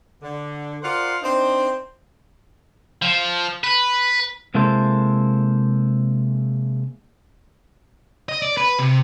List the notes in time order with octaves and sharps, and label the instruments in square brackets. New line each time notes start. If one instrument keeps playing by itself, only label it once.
[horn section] D3
F4 A#4 C5 D5 F5 F#5
C4 D4 D#4 C5
[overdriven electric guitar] F3
B4
[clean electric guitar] C3 G#3 A#3 E4 A4 C5
[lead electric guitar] D#5
D5
B4
C3